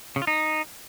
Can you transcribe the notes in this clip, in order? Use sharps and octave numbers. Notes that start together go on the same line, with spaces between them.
C#3
F4
D#4